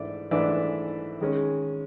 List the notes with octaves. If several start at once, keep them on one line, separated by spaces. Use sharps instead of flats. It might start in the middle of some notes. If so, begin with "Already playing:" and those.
Already playing: G#2 E3 A3 D4 D5 E5
G#2 E3 A3 D4 D5 E5
D#3 G#3 C#4